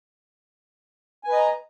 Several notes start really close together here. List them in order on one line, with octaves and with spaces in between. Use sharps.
G#5 B4 D#5 A#5